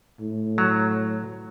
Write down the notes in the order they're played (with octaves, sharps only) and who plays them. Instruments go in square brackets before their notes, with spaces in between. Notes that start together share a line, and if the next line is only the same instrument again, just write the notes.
[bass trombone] A2
[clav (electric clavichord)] F#3